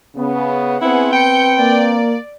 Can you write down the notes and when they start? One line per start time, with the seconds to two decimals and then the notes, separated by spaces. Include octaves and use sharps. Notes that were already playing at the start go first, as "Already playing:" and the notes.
0.16 C#3 B3
0.81 B3 C4 E4 G#4 B4 F#5
1.13 G5 G6 C#7
1.59 A#3 D5